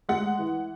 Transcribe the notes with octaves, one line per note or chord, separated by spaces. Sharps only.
G#3 F#5
E3